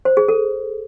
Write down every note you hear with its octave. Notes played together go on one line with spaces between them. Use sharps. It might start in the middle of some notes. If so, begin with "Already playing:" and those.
C5
G#4
A4